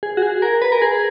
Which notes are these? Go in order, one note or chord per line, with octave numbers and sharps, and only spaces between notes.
G#4
F#4
G#4
A#4
B4
A#4
G#4